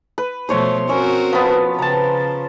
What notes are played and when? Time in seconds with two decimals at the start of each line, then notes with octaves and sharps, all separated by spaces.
0.18 B4
0.49 B2 F3 A3 C5 C#5 C6
0.89 C4 C#4 F#4 A#4 E6
1.33 F3 B3
1.79 C#3 A5 A#5